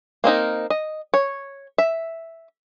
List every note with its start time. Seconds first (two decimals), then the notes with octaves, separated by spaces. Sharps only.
0.24 A#3 C4 D#4 A#4
0.70 D#5
1.14 C#5
1.78 E5